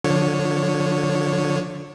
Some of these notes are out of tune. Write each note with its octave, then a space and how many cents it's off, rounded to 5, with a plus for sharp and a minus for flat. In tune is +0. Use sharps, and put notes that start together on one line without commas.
D3 +0 F3 +35 C#5 +0